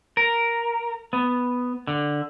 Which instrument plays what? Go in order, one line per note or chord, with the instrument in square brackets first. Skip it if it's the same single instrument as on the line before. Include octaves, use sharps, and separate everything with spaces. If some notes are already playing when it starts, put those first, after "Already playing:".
[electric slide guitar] A#4
B3
D3